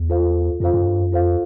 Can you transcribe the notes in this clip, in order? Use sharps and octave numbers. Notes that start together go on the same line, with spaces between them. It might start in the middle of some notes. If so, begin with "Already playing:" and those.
Already playing: E2
F4 A4 C5 F5
F2 F4 A4 C5 F5
F#2
G2
F#2
F2 F4 A4 C5 F5